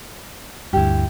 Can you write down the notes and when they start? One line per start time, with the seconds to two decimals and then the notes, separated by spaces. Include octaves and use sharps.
0.73 D2 G2 E4 G4